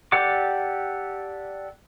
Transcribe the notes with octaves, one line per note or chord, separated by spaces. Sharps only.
G4 A4 D5 F#5 D6